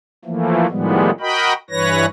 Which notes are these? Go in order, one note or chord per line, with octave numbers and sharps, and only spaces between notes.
E3 F3 A3 A#3
A2 D#3 F3 G3 G#3 B3
F#4 A#4 D#5 G5 B5
G2 E3 B4 C#5 A#6